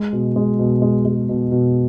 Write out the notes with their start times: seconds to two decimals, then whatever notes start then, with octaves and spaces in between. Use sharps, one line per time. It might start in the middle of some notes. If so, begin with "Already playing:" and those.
Already playing: G#3
0.13 B2
0.36 G#3
0.59 B2
0.82 G#3
1.05 G#3
1.29 B2
1.52 B2